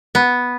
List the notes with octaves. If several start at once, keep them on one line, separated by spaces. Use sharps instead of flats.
B3